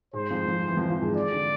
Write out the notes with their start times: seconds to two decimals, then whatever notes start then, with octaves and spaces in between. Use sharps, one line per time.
0.13 G#2 G#3 C5
0.30 F2 F3
0.47 F2 F3
0.68 E3
0.77 F2 F3
0.90 F2 F3
1.02 G#2 G#3
1.15 D5
1.32 D3